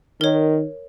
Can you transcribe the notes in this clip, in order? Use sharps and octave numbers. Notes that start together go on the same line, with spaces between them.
D#3 A#4 C#5